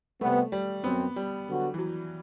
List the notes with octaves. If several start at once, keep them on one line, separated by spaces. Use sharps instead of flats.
C3 G3 A3 B3
G3
F#2 F#3 B3 C4
G3
D3 F#3 B3 F#4
E3
F#3